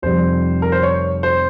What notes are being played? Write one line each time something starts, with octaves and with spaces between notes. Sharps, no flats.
F1 F2 C3 G3 C5
A#4
C5
C#5
C5